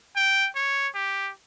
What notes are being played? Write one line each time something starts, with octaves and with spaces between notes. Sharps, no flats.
G5
C#5
G4